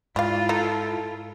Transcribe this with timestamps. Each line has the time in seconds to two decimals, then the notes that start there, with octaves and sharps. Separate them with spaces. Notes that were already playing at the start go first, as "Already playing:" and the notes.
0.16 G#2 G3 E4 F4 F5
0.49 D#4 A4